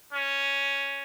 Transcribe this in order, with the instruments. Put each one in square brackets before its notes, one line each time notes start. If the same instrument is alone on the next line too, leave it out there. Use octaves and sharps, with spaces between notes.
[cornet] C#4